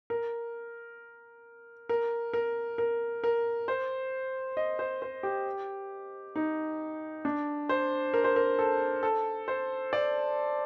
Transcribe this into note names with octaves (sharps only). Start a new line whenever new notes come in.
A#4
A#4
A#4
A#4
A#4
C5
D#5
C5
C5
G4
D#4
D4
C5
A#4
C5
A#4
A4
A4
C5
D5